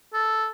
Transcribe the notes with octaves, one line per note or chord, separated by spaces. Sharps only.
A4